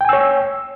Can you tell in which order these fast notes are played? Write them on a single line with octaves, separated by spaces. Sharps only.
G5 G#5 E6 C#5